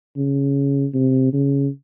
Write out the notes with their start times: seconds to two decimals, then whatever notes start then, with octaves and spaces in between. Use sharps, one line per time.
0.17 C#3
0.94 C3
1.33 C#3